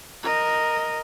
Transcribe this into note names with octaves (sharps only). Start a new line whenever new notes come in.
A#4 D#5